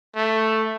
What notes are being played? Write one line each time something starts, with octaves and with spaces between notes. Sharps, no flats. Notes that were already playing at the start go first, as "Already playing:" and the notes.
A3